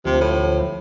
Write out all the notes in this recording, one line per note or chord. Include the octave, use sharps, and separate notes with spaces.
D2 C3 F3
A2